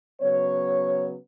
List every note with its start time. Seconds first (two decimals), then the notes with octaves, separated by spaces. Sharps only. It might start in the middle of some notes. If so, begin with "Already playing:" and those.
0.21 C#3 F#3 B3 C#5